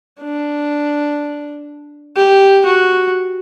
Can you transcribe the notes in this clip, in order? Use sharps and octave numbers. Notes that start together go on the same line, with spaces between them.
D4
G4
F#4